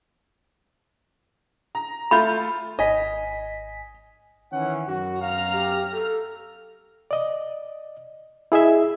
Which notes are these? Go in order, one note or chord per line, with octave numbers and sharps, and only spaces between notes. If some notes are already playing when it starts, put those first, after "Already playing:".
A#5
A3 F4 B5 G6
G#1 D#5 G#5 B6
D#3 E3 C#4 F#5
F#2 F#4
F5 A#5 F6
G4
A4
D5 D#5
E4 G#4 D#5 E5